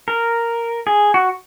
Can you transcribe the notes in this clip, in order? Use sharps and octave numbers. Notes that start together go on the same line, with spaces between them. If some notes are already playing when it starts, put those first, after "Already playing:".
A#4
G#4
F#4